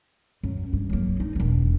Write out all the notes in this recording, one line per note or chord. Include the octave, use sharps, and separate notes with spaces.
F#2
G2
F#3 A#3
D#4
E1 D#3